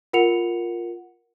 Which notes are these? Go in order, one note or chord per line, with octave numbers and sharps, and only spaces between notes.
F4 A#4 F#5 C#7 F7